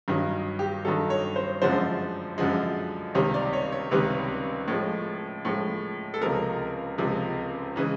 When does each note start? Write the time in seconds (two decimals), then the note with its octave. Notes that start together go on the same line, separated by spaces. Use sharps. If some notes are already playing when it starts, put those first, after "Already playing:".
0.08 G2 D#3 F#3
0.59 G4
0.85 G2 D#3 F#3 A4
1.10 C#5
1.36 C5
1.62 F#2 D3 F3 G#3 C5
2.38 F#2 D3 F3 G#3
3.15 C#2 C3 D#3 G3 C#5
3.34 D5
3.53 C#5
3.72 C#5
3.91 C#2 C3 D#3 G3 B4
4.68 A2 F3 G#3
5.45 A2 F3 G#3
6.14 A4
6.21 C#2 C3 F3 G#3 A#4
6.98 C#2 C3 F3 G#3
7.76 C#3 E3 G#3